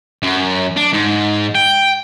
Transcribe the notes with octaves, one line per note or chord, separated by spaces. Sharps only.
F#2
D4
G#2
G5